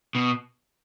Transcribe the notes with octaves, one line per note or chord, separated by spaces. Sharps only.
B2